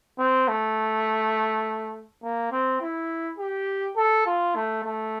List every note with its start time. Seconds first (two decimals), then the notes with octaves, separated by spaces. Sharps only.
0.19 C4
0.48 A3
2.23 A#3
2.52 C4
2.81 E4
3.39 G4
3.97 A4
4.27 F4
4.56 A3
4.84 A3